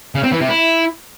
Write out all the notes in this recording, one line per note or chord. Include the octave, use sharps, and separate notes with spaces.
C#3
C4
E3
C3
E4